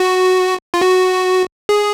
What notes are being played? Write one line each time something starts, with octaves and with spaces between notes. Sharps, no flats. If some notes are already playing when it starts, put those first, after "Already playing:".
Already playing: F#4
F4
F#4
G#4